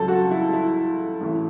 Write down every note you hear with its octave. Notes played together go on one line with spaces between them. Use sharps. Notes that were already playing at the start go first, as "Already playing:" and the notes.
Already playing: C#2 C#3 F#3 A4
F#4
E4
E4
A1 A2 E3